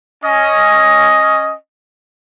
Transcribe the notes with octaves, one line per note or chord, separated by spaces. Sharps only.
C#4 D#5